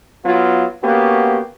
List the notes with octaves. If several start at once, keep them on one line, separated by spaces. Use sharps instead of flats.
F#3 B3 F4
A#3 B3 C#4 F#4 G4